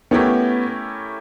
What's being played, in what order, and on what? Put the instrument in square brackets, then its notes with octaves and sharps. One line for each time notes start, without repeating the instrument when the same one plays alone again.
[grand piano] A3 C#4 E4 G4 A#4 [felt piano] B3